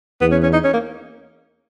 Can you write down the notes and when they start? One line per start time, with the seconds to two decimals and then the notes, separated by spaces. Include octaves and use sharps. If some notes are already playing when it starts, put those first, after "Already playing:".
0.21 E2 B3
0.32 C#4
0.43 C#4
0.53 D#4
0.64 C#4
0.74 A#3